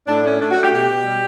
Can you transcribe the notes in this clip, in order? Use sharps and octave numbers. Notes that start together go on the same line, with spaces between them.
A2 D4
A3 C#4
A3 D4
F#4
A3
G4
B2 G4
B2
G3